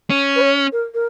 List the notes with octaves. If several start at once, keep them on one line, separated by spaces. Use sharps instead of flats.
C#4
B4
C#5
A#4
A#4